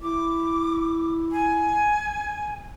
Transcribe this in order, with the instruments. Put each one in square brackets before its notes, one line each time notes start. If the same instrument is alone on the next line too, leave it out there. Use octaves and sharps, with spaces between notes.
[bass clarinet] E4 [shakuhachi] D6
[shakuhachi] G#5